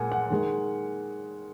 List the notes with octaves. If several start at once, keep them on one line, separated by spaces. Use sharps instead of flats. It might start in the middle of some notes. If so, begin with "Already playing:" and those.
Already playing: A#2 G#3 F#5 G#5
F#5
D#3 G#3